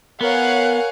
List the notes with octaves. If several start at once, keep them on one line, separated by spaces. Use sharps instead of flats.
B3 A#4 C#5 F5 F#5 G#5